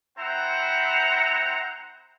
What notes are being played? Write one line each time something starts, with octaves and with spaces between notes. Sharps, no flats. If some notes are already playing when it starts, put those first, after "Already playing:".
C4 E4 C5 F#5 A#5